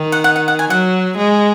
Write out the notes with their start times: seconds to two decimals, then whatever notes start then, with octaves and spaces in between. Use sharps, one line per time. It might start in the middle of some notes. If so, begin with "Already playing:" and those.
Already playing: D#3
0.12 F#5
0.24 F#5
0.36 F#5
0.48 F#5
0.59 G#5
0.70 F#3 F#5
1.17 G#3